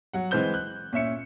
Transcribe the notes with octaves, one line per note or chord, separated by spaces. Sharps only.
F#3 F#5
E3 G#3 C4 C5 G6 G7
F#6
A#2 C#4 E5 C#7